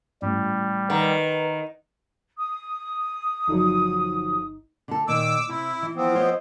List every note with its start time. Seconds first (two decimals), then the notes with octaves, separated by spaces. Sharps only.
0.22 A1 G3
0.90 D#3 B4 F#5 A#5
2.37 D#6
3.48 G1 D3 F3 F#3 D#4
4.88 D3 A4
5.08 A#2 D#3 D6 E6
5.49 C3 E4
5.82 E3
5.96 F3 B3 C4
6.15 C5 C#5 D#5